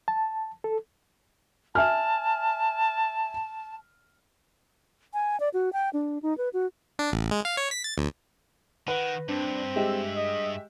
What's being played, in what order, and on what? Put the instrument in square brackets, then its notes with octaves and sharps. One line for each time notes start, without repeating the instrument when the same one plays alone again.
[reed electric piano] A5
A4
[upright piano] E5 G#5 F6 [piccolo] A5
[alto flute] G#5
D5
F#4
G5
D4
D#4
B4
F#4
[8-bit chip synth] D4
A1
G#3
F5
C#5
B6
A6
D2
[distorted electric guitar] D#3 [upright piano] B4 [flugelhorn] F#5
[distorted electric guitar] G2 [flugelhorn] C4 [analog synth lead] D4
[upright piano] G#3 G4 [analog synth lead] E5
[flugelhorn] D#5